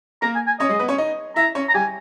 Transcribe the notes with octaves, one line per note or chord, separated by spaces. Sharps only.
A#3 A#4 A#5
G#5
G#5
C#4 C#5 D#5
G#3 G#4
B3 B4
C#4 C#5
D#4 D#5
E4 E5 A#5
C#4 C#5
A#5
G3 G4 G#5